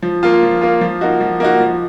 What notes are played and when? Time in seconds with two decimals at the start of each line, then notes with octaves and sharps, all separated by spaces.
0.02 F3
0.23 A#3 F4
0.42 F3
0.61 A#3 F4
0.81 F3
1.01 A#3 D#4 F#4
1.21 F3
1.40 A#3 D#4 F#4
1.60 F3